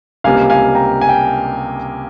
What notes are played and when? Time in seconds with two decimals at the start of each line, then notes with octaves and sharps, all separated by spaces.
0.24 C#2 C3 G3 A#3 F5 G#5
0.50 F5 G#5
0.75 G5 A#5
1.01 G#5
1.09 G5